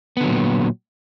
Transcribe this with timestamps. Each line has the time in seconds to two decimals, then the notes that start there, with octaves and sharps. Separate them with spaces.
0.17 B3
0.20 D3
0.24 F#3
0.28 A#2